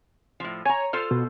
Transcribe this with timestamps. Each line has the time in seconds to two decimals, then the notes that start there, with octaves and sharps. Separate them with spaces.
0.40 A2 F3
0.65 C#5 G#5 A#5
0.93 F4 A4 C5 F6
1.11 B2